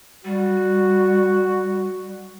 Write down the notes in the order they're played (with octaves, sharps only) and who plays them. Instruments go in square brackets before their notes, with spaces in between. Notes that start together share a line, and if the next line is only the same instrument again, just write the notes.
[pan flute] G3 [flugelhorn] F#4